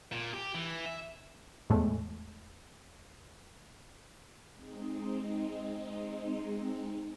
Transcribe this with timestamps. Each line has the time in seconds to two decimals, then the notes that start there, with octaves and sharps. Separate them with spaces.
0.12 A#2
0.33 G4
0.55 E3
0.86 E5
1.70 E2 A2 G#3 A3
4.52 G#3 C4 D#4